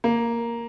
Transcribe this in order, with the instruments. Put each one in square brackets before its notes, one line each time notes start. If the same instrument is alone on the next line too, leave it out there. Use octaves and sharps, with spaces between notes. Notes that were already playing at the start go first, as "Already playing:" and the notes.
[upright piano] A#3